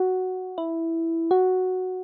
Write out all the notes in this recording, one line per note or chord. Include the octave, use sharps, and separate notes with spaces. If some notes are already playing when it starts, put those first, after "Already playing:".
Already playing: F#4
E4
F#4